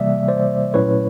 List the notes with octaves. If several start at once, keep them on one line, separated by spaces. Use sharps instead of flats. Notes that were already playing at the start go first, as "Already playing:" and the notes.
Already playing: C3 E3 G3 A#3 D5 E5
C5 D5
A#2 F#3 A3 C#4 E4 B4 C#5